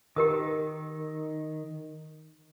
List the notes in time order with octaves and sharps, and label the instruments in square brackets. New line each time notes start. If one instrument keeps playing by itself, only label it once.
[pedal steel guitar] D#3 [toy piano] G4 A#4 D#6